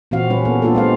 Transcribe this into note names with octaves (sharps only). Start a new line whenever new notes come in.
A#2 E3 C4 F#4 F5
G3 C#4 B4
A#3 B3 A4
A#3 D4 F4 G4 A4
G#3 C4 F5